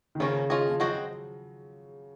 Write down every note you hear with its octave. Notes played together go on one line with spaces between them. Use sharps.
D#3
C#3 F3 A#3 C#4 F#4 A#4
C#4 F4 G#4 D#5
F3
F#3 G#3 C4 F#4 C5 D#5